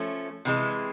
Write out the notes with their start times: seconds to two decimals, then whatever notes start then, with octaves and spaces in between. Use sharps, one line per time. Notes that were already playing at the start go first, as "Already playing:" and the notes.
Already playing: F3 A3 C#4
0.45 C3 E3 G#3